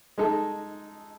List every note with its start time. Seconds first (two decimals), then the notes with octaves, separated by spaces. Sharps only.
0.18 G#3 D#4 A4